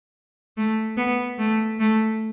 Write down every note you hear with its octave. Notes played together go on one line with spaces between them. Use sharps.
A3
B3
A3
A3